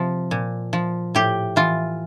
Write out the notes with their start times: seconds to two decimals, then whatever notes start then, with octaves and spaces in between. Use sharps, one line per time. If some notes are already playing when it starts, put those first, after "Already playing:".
Already playing: C3 F3
0.31 A#2
0.73 F3
1.15 A2 G4
1.56 E3 F4